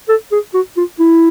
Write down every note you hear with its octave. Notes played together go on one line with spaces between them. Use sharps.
A4
G#4
F#4
F4
E4